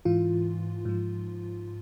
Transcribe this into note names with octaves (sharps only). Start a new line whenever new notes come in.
G#2 E3 F4
G#2 F3